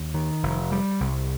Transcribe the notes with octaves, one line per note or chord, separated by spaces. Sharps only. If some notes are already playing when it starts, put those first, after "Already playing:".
Already playing: D#2
D#3
F1
G3
C2